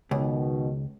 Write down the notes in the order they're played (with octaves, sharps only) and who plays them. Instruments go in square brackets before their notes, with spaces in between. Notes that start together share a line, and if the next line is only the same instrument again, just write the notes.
[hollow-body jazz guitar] C#2 [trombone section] B2 D#3